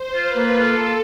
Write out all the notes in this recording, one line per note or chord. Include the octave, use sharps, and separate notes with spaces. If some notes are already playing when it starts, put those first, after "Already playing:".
Already playing: C5
F4
B4
A#3
F4 A4
A#3